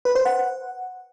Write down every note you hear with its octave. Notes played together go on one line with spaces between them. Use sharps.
B4
C5
F#5